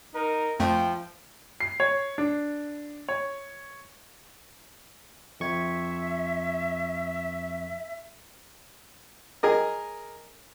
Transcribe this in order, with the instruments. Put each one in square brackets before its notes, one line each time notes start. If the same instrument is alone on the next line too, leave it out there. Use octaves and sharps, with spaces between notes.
[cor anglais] D#4 [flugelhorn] A#4
[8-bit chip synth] F2 A3 [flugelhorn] F3 [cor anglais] G5
[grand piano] C7
C#5
D4
C#5
[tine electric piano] F2 C#6 G#6 [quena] E5
[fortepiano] G#4 A#4 D#5